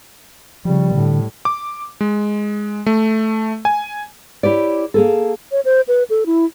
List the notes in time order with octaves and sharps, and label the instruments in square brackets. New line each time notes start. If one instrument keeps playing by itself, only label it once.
[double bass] C#3 G3 [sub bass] F3
[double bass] A2 [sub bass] D3
[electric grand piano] D6
G#3
A3
G#5
[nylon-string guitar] E4 G4 C#5 D5
A#3 G#4 A4
[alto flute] C#5
C5
B4
A4
E4